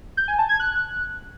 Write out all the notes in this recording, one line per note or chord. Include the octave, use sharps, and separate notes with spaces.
G6
G#5
A5
G#6
F#6